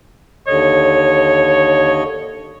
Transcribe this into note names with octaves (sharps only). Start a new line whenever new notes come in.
D#2 D3 C#5 D#5